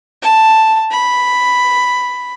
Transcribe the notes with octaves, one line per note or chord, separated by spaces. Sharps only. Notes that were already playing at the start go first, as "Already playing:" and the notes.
A5
B5